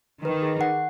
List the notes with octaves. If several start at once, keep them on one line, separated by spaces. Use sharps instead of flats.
D#3 B4
G#4
F#5